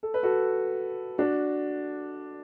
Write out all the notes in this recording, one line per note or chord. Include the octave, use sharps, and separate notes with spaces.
A4
B4
F#4 A4
D4 F#4